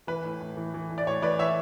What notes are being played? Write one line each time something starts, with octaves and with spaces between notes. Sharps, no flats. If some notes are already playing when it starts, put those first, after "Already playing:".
E3 B4
A2
A2
E3
E3
A2
D5
A2 C#5
E3 B4 D5
E3 C#5 E5